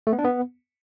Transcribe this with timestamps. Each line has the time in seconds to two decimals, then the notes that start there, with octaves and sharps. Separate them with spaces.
0.07 A3
0.13 B3
0.19 D4
0.24 B3